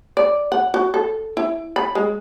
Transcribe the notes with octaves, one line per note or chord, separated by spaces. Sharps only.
D5
F#5
F#4
A4
E4
B5
G#3